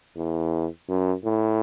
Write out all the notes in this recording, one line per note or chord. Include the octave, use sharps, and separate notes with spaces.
E2
F#2
A2